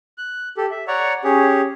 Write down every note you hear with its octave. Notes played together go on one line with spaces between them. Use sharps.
F#6
G4 A4
E5
C#5 D5 F#5 A#5 C#6
C#4 G4 G#4 C#5